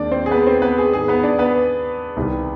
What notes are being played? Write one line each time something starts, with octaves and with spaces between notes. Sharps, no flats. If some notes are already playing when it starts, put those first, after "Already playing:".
Already playing: D#2 D#3 G#3 C4 D4 D5
C4 C5
G#4
B3 B4
C4 C5
B3 B4
G#4
G#2 D#3 B3 G#4
B3 B4
D4 D5
B3 B4
C2 C3 D#3 G3 B3